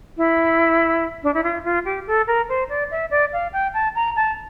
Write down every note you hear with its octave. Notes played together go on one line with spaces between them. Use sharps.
E4
D4
E4
F4
F4
G4
A4
A#4
C5
D5
E5
D5
F5
G5
A5
A#5
A5